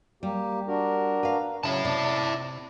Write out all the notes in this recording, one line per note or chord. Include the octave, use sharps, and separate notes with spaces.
G3 A#3 G4
D4 F#4 A#4
B4 F5
C#3 F#3 E4 A5
C3 D5